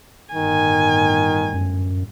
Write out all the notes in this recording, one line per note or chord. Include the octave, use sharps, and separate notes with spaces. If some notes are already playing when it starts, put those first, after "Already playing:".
G1 A2 D#3 G#5
F#2